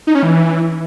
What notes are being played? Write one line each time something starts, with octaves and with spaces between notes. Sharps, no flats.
D#4
C#4
E3